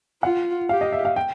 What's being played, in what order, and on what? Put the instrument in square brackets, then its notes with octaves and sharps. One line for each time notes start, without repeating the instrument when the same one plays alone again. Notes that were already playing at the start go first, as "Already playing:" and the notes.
[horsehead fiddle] F4 [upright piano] F#5
[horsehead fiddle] G4 [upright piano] F5
[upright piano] D#5
E5
F5
G5